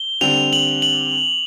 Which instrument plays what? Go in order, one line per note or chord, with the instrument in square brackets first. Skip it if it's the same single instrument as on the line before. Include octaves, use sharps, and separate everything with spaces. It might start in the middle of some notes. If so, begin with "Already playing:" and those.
Already playing: [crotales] G7
[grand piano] D3 G3 C4 [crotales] F7
[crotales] F#7
F#7